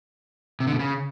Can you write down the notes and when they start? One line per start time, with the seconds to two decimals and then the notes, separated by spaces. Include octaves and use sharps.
0.60 C3
0.67 D3
0.73 B2
0.79 C#3